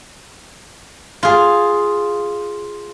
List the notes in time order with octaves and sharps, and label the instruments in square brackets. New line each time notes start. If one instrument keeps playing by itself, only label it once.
[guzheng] F4 G#4